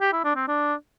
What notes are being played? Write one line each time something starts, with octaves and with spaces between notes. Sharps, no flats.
G4
E4
D4
C4
D4